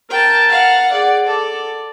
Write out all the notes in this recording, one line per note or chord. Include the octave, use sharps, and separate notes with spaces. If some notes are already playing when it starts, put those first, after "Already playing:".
A#4 G5 A5
F5 F#5
G#4 D5 F#5
A4 D5